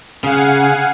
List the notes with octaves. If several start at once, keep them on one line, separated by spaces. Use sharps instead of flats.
C#3 F5 F#5 G#5